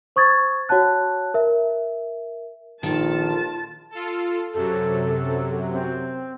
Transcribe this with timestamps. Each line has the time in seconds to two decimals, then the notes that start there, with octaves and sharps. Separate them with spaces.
0.16 C5 C#6 D#6 G#6 A6
0.69 F#4 C#5 F#5 A5 F#6
1.34 A#4 E5
2.83 A#1 D#3 F4 A4 A5
3.91 F4 A4
4.54 F#2 C3 F#3 A4
5.73 C4